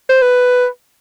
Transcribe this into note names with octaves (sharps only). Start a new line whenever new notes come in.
C5
B4